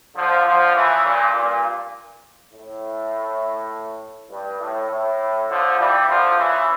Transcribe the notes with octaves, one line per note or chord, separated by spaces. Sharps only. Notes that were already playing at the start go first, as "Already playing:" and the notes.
D3 F3
D3 F3
C#3 E3
G2 A#2
G2 A#2
A2
G2
A2
A2
D3 F3
E3 G3
D3 F3
C#3 E3